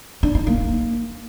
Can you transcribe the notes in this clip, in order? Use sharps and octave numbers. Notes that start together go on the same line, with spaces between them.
D4
D#4
A#3